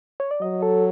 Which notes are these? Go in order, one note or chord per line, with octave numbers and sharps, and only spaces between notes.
C#5
D5
F#3 D#5
A4